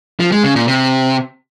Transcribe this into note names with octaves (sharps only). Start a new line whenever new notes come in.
F3
G#3
C#3
A#2
C3